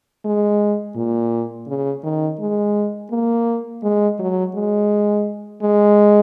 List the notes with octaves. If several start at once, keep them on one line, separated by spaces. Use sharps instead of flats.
G#3
A#2
C#3
D#3
G#3
A#3
G#3
F#3
G#3
G#3